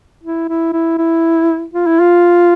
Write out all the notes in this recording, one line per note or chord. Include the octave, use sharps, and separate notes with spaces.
E4
E4
E4
E4
F4
E4
F4